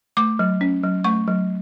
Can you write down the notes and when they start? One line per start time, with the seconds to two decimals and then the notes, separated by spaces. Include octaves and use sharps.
0.17 A3 D6
0.39 F#3
0.61 C#4
0.83 F#3
1.04 A3 C#6
1.28 F#3